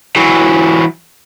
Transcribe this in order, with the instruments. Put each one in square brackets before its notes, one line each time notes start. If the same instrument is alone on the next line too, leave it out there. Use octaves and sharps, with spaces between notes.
[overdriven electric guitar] E3 F#3